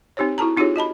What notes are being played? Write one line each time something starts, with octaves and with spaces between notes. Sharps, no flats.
C4 D#4 G4 C5 C#5
E4 F#4 A4 A5 A#5
C4 D#4 F4 G4 G#4 C#5
F#4 D#5 A5 B5